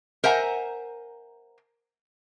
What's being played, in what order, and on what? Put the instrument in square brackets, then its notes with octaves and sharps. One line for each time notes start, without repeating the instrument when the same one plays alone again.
[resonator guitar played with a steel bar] A#4 C5 E5 F#5 G#5 A#5